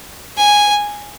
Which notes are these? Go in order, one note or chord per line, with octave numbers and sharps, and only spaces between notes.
G#5